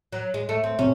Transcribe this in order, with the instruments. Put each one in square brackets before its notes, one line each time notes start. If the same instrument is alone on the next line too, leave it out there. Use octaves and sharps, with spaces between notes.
[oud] F#3
G#3
A3
C4
[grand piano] C3 [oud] C#4